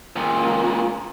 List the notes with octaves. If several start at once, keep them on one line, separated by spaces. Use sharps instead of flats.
C#2 A#2